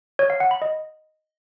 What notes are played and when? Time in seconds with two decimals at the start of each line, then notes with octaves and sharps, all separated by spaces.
0.19 C#5
0.30 F5
0.40 F#5
0.51 B5
0.62 D#5